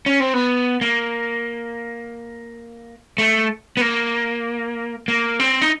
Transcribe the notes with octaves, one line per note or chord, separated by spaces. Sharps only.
C#4
C4
B3
A#3
A3
B3
A#3
A#3
C4
D#4